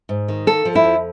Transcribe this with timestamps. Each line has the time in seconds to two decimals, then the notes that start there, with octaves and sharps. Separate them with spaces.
0.09 G#2
0.28 D#3
0.47 A#3 A4
0.65 F3
0.75 E4
0.84 F2